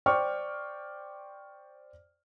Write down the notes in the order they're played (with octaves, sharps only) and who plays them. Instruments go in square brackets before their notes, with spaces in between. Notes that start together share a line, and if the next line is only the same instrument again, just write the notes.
[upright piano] C5 D5 G5 C#6 D6 F6